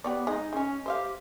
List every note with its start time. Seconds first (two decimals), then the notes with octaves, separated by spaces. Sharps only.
0.04 B3 G4 C#5 D5
0.27 G#3 D#4 D#5
0.53 G#3 C#4 G#5
0.86 G4 C5 E5 F5